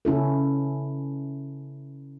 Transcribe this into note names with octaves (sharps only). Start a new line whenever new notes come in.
C#3 C#4 E4 A4